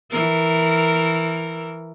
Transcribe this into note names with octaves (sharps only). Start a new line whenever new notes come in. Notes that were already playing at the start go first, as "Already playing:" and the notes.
E3 A#4